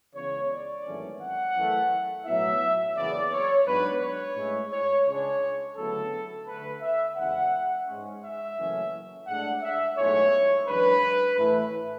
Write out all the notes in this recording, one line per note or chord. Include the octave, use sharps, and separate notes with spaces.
C#2 C#3 E3 B3 C#5
D5
G#1 F#2 E3 A3 C#4
F#5
F#2 E3 A3
B1 A2 F#3 B3 E4 E5
F#1 E2 C#3 E3 B3 D5
C#5
G#2 F#3 B3 D4 B4
C#5
A2 G#3 C#4 E4
C#5
C#2 C#3 G#3 D4 C#5
D2 C#3 F#3 B3 E4 A4
D2 D3 A3 B4
E5
E2 C#3 G#3 B3 E4 F#5
G#2 G#3 C#4
E5
F#1 F#2 E3 A3 C#4
A2 G#3 D4 F#5
E5
B1 A2 G#3 C#5
F#2 E3 G#3 D4 B4
A2 E3 A3 E4